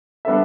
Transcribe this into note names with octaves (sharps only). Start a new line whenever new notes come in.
G3 B3 D4 A4 E5